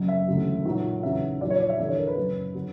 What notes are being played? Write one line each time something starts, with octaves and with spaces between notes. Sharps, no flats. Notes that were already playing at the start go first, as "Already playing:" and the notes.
Already playing: F#1 F#2 C#3 F#3
E5
E1 D2 C#3 F#3
B1 A#2 F#3
E2 C#3 F#3 E5
A#1 A#2 F#3 D5
C#5
D5
E5
E2 D3 G3 D5
C#5
A#4
B4
F#1 F#2 C#3
D3 F#3